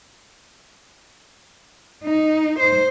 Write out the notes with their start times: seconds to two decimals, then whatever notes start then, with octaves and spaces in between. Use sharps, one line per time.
2.04 D#4
2.59 C5